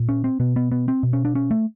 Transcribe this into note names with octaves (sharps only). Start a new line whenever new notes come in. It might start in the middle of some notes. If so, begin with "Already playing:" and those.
Already playing: A#2
C#4
C4
B2 B3
B3
B3
C4
B2
C#4
D4
C#4
A3